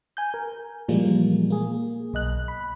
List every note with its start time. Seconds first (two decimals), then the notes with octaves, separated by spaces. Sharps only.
0.17 G#5 G6
0.34 A#4
0.88 A#2 E3 F3 G3 G#3 A#3
1.50 A#3 G#4
2.14 B1 D#5 F#6
2.48 B5